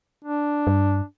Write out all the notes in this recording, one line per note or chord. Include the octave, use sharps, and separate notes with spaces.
D4
G2